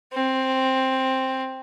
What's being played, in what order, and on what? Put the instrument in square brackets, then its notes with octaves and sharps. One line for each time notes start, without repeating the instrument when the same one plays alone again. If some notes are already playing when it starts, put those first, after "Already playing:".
[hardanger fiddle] C4